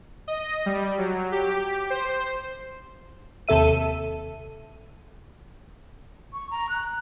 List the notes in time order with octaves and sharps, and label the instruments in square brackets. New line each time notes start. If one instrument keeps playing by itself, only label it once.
[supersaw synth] D#5
G3
F#3
G4
C5
[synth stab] D#2 C3 A4 E5 D#7
[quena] C#6
A#5
F#6